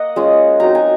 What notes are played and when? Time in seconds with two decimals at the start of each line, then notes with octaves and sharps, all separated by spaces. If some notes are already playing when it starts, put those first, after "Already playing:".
Already playing: A#3 D#5 F#5
0.16 G#3 C#4 F4
0.60 F#3 C4 D#4 A#5
0.75 G#5